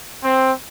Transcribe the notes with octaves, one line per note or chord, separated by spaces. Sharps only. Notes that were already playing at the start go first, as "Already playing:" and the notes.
C4